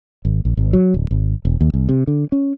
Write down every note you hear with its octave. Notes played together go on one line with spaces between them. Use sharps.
G#1
A#1
G#1
F#3
D1
G#1
E1
D#2
C2
C3
D3
C#4